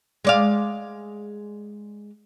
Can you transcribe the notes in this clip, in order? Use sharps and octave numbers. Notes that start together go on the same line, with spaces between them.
G#3 D5 F5